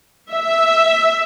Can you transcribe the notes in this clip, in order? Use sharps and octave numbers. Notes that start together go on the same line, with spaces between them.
E5